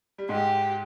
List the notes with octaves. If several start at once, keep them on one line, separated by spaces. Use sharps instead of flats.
G3
G#2 G#3 G4